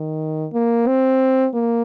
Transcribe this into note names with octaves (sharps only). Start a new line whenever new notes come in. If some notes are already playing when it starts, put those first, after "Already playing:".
Already playing: D#3
A#3
C4
A#3